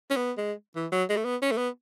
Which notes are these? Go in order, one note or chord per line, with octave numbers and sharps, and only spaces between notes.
C#4
B3
G#3
E3
F#3
G#3
A3
B3
C#4
A3
B3